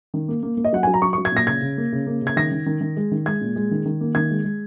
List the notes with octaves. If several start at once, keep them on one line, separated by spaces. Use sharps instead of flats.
D#3
A#3
A#3
A#3
D#5
F#3 F#5
F#3 G#5
A#5
F#3 C#6
F#3 C#6
G#6
A#2 A#6
C#3 G#6
C#3
A#3
C#3
A#3
C#3 G#6
D#3 A#6
D#3
D#3
D#3
G#3
D#3
G#3 G#6
A#2
G#3
D#3
D#3
A#3
D#3 G#6
G#3
G#3